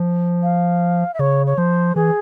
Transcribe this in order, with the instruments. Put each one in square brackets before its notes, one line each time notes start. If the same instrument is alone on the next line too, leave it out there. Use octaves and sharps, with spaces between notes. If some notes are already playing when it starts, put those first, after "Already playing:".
Already playing: [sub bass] F3
[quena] F5
E5
[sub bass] C#3 [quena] C#5
[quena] C#5
[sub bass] F3 [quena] C5
[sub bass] E3 [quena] G#4